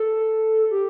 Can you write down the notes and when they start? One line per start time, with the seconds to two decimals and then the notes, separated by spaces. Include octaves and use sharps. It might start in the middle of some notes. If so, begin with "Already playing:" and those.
Already playing: A4
0.71 G4